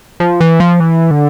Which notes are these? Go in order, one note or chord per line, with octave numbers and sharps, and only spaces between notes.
F3
E3
F3
E3
D3